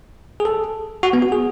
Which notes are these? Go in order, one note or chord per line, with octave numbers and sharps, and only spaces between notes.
G#4
A4
F#4
B3
F#4
G#4